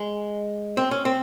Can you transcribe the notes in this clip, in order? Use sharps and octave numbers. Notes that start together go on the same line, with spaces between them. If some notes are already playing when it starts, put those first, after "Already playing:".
Already playing: G#3
C4
C#4
C4